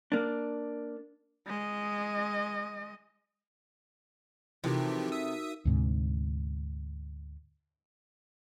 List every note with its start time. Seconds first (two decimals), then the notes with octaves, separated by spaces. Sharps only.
0.12 A#3 D4
1.46 G#3 D#5
4.64 C3 E3 F3 A3 D#4 F#4 G4 A#4
5.12 E5 D#6
5.65 D2 G#2 C3